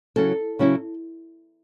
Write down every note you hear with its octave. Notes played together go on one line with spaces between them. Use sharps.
C#3 F#3 C#4 E4 A4
C#3 F#3 C#4 E4